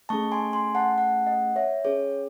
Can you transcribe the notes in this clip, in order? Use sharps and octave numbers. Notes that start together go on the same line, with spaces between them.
A3 C#4 G#4 A5 C#6
G#5 C6
G#5 C6
F#5 A5
F#5 A5
D#5 F#5
C#5 E5
C#4 G#4 C#5